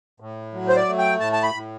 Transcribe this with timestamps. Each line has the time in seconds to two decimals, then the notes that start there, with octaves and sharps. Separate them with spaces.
0.20 A2
0.54 F#3
0.68 C5
0.76 D5
0.87 A3
0.98 G5
1.20 A2 A5
1.33 A5
1.43 B5
1.54 A2